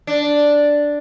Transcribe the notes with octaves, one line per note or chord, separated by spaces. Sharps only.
D4